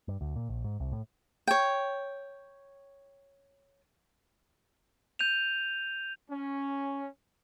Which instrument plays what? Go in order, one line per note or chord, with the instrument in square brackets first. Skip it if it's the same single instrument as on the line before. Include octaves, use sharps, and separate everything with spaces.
[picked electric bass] G2
D2
A#2
A#1
G#2
C2
A2
[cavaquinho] C#5 G5
[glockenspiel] G6 D#7 F7
[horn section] C#4